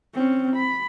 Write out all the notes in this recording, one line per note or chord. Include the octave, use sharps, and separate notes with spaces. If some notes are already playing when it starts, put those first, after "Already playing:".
C4 C#4
B5